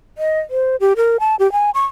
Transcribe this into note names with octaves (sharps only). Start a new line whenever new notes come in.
D#5
C5
G4
A#4
A5
G4
G#5
C#6